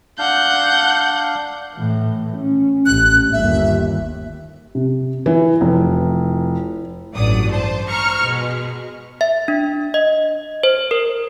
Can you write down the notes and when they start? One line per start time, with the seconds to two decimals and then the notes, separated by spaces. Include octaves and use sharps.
0.19 D4 F5 F#5 G6
1.76 A2 E3
2.38 C#4
2.86 A1 F#6
3.33 G1 D#2 E5
4.75 C3
5.26 E3 E4
5.61 F1
7.13 A1 G2 F#3 D5 D#6
7.49 C5 A5
7.87 C5 A#5 C#6 F6 C#7
8.22 B2 G#3
9.21 E5
9.48 D4
9.94 D#5
10.63 C5
10.91 A#4